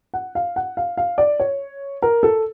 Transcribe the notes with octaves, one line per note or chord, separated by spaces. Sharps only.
F#5
F5
F#5
F5
F5
D5
C#5
A#4
A4